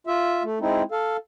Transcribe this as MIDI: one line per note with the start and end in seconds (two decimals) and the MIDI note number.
0.07 0.43 65
0.07 0.43 76
0.43 0.59 57
0.61 0.83 56
0.61 0.83 60
0.61 0.83 63
0.61 0.83 64
0.92 1.17 69
0.92 1.17 77